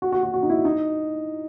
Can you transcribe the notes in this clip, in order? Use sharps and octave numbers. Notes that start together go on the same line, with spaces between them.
F#4
F#4
F#4
F#4
D#4
E4
D#4